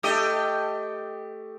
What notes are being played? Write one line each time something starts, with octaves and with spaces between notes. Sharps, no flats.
A3 G4 D#5